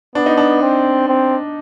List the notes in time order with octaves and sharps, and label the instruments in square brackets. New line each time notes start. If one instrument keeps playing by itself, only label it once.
[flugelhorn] B3 [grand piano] D4
[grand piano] D#4
D4
[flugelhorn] C4
C4